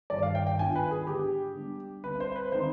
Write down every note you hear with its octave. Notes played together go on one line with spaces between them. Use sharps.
G2 D#3 G3 D5
F5
G5
G5
G#2 D#3 B3 D4 F4 G#5
B4
G#4
D3 G#3 D4 G4
D3 G3 B3 D4
D3 G3 C4 B4
C5
B4
D#3 G#3 C4 D#4 C5